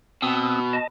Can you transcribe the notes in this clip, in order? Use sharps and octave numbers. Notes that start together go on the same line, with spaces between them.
B2 C4 D#6 E6
D#5 A5